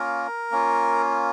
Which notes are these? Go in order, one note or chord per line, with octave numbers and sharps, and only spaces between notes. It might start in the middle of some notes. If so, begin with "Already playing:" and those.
Already playing: A#3 C#4 F4 A#4
A#3 C#4 F4